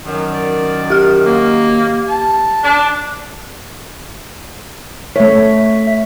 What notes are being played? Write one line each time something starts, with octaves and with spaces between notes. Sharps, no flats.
F#2 D#3
D5
G4 F6
A#3
A5
D4
A3 C#5 E5